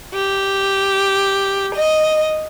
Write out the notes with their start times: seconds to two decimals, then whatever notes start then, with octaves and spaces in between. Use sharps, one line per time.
0.12 G4
1.74 D#5